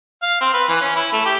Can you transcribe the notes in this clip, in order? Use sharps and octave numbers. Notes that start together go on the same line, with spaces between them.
F5
C4
B4
E3
C#4
E4
A3
G4